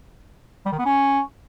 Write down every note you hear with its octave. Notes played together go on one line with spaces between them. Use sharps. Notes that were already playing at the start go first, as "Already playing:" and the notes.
G3
D#3
B3
C#4